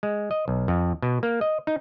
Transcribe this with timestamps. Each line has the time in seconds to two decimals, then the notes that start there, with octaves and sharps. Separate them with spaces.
0.03 G#3
0.31 D#5
0.48 B1
0.68 F2
1.02 B2
1.23 A#3
1.41 D#5
1.67 D#4